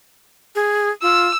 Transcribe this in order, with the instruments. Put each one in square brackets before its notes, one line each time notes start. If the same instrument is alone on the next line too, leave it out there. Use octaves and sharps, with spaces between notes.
[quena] G#4
[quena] F4 [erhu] E6